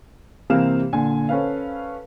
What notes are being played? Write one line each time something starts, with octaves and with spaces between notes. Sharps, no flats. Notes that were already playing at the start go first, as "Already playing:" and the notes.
C3 E3 A#3 C4 F5 E7
A#2 D3 G#5
C#4 A4 B4 C5 F5